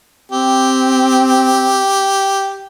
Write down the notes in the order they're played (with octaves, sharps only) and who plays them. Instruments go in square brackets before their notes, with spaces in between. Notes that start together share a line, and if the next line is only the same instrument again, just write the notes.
[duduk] C4 [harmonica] G4